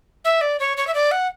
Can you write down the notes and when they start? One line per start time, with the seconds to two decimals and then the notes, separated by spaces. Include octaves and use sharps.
0.25 E5
0.41 D5
0.60 C#5
0.77 C#5
0.87 E5
0.94 D5
1.11 F#5